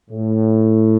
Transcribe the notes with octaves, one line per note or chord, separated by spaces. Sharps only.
A2